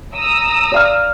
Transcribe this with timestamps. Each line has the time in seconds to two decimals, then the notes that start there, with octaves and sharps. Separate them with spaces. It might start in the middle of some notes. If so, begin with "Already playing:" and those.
0.16 A#5 D#6 E6
0.72 D5 F5 F6